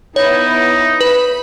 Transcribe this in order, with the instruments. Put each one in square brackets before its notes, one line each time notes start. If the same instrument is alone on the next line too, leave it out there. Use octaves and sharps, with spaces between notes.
[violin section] B3 E4 [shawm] D#4 [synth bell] C#5
[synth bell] B4 [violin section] B5